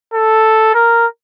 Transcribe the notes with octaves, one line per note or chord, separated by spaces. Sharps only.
A4
A#4